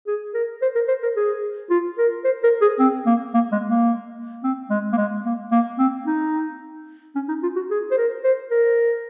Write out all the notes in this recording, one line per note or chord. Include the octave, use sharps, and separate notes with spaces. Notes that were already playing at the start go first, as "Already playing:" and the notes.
G#4
A#4
C5
A#4
C5
A#4
G#4
F4
A#4
C5
A#4
G#4
C4
A#3
A#3
G#3
A#3
C4
G#3
A#3
G#3
A#3
A#3
C4
D#4
C#4
D#4
F4
F#4
G#4
C5
A#4
C5
A#4